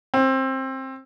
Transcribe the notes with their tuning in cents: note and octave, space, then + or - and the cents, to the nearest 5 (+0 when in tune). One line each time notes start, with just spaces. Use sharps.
C4 +20